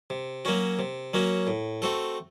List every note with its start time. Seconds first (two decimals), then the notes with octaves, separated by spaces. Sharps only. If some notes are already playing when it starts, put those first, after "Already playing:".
0.10 C3
0.45 F#3 A#3 C#4 F#4
0.79 C3
1.14 F#3 A#3 C#4 F#4
1.47 A2
1.82 A3 C4 F#4 A4